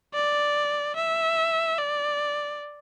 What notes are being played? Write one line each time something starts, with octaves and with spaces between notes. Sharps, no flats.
D5
E5
D5